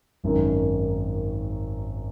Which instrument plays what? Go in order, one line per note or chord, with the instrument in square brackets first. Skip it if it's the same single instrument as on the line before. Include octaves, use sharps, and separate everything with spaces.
[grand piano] G#1 F#2 D#3